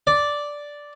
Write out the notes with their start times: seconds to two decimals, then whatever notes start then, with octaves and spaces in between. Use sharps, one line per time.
0.07 D5